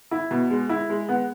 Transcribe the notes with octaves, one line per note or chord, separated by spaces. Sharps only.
E4
B2
G#3
E4
G#3
B3